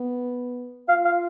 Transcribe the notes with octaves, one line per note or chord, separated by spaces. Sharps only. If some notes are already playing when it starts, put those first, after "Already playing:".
Already playing: B3
F4 F5
F5